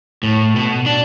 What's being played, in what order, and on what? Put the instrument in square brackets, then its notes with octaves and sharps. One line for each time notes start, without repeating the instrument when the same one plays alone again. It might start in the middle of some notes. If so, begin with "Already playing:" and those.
[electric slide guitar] A2
B2
D4